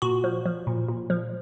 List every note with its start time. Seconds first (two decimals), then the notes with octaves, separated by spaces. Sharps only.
0.02 A#2 F#4
0.24 F3
0.46 F3
0.67 A#2
0.89 A#2
1.10 F3